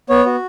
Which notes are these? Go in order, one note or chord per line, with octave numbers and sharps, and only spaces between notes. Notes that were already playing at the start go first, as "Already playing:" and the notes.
B3 C#5
F#4